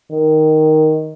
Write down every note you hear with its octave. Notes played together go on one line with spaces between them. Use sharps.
D#3